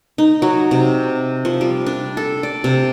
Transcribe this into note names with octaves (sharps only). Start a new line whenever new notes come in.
D#4
F#3
C3
F3
G3
D4
A4
D5
C3